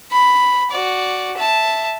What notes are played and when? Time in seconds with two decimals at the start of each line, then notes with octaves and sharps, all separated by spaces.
0.11 B5
0.71 F#4 D5
1.37 E5 A5